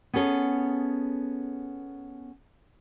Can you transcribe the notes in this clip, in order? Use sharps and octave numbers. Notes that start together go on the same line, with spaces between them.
B3 C#4 G#4 A4 C#5